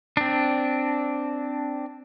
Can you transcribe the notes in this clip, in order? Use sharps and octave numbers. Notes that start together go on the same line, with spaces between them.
C4 D4